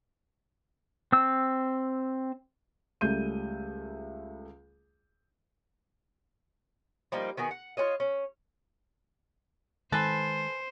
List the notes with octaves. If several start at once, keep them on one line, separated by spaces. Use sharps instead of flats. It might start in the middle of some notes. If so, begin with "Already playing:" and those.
C4 E6
C#2 G3 A3 G6 D#7
F3 G3 A#3 D#4
D#3 B3 F#4 G#4
F#5
F4 F#4 C#5 D#5
C#4
D#3 G#3 A4 B4 C5 G#5 B5